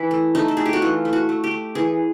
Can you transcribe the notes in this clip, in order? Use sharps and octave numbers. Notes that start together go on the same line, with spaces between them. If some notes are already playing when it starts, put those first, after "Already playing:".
Already playing: E3 E4
A3
A3 D#4
A4
A3 G#4
G4
F#4
E3 F4
A3
F#4
A3
G4
A3
E3 G#4